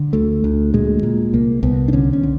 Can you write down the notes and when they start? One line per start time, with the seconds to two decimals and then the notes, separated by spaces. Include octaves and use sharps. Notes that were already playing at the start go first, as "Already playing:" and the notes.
Already playing: D3
0.13 D2 A3
0.44 D2
0.74 A#2 G#3
1.03 A#2
1.33 C2 A#3
1.63 C2 B3
1.88 D4
1.93 D3 C#4
2.13 C#4
2.23 D3